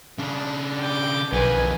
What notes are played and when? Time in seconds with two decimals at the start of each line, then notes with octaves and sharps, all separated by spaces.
0.18 C#3 D4
0.80 G5 D6
1.33 B1 F2 D#3 B4 G#5